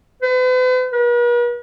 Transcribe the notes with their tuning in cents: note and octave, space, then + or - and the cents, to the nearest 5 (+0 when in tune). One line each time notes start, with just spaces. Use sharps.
B4 +45
B4 -45